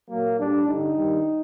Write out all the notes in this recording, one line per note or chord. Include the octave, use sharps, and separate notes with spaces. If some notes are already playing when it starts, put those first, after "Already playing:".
A#2 F#3 A#3
A2 G3 D4
G2 D3 G3 D#4
G2 D#3 G3